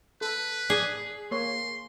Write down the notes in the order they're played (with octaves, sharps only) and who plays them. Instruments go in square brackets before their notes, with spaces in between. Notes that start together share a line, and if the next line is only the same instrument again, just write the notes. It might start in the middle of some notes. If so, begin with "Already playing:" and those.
[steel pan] A4 [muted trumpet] B4
[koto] G#4 [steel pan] D5
[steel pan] A#3 C#5 [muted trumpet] C6